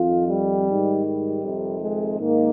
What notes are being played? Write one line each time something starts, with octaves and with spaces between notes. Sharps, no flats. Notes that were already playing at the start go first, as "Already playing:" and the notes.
Already playing: F2 D#3 F4
G3
G#2 D#3
G3
F2 C3 D#3
G#3
G#2 D#3 A#3